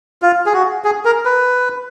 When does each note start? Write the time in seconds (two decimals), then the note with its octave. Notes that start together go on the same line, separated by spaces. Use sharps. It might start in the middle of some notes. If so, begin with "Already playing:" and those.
0.22 F4
0.46 G#4
0.53 F#4
0.84 G#4
1.05 A#4
1.25 B4